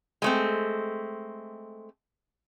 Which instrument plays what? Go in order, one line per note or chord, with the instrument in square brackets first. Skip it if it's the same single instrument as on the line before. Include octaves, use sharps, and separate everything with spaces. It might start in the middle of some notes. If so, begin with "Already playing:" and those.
[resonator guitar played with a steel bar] G#3 A3 C4